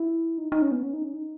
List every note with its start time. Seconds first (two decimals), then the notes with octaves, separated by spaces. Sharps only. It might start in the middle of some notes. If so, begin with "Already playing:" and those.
Already playing: E4
0.38 D#4
0.52 D#4
0.62 C#4
0.72 B3
0.83 C#4
0.93 D#4
1.04 C#4
1.14 D#4